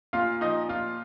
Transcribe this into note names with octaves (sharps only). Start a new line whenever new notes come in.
A#2 F4 F5
F3 D#4 D#5
A#2 F4 F5